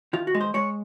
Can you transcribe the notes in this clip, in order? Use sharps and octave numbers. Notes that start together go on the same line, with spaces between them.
D#3 F4
F#4
G#3
C5
G#3 C#5